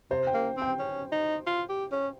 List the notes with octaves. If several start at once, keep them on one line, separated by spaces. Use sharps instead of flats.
C3 C5
G5
A#3
C4
G5
C#4
D#4
F4
G4
C#4